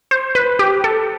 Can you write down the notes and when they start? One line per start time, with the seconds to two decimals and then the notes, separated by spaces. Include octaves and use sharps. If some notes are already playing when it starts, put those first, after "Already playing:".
0.11 C5
0.35 B4
0.59 G4
0.84 A4